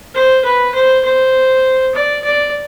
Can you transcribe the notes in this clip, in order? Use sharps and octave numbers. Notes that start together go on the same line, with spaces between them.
C5
B4
C5
C5
D5
D5